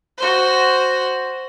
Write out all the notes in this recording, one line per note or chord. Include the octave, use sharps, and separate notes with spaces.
F#4 C5